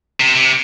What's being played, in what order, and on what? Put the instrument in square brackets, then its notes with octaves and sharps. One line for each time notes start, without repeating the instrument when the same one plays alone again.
[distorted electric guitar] C3
C3